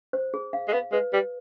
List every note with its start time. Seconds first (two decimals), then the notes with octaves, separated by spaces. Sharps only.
0.13 C5
0.34 G#4
0.53 F5
0.68 G#3
0.73 B3 F5
0.92 G#3 B4
1.13 G3 B4